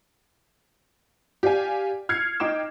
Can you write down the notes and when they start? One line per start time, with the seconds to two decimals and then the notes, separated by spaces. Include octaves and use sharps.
1.43 G4 D5 F5 G#5
2.09 F6 G#6 C7 C#7
2.40 D#4 G5 D6 E7